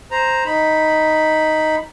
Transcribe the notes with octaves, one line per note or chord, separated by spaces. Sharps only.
C5 A#5
D#4 B5